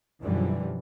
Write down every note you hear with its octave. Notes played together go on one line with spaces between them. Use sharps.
F#2 B2 D3 E3 F3 G3